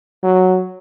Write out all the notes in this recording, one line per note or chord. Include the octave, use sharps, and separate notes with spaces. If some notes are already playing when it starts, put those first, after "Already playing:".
F#3